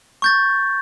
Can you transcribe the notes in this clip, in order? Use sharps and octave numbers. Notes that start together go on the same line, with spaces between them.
C#6 G6 A6